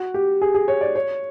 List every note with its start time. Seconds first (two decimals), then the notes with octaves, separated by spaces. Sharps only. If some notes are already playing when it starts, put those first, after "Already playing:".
Already playing: F#4
0.14 G4
0.42 G#4
0.55 G#4
0.68 C#5
0.81 D5
0.96 C#5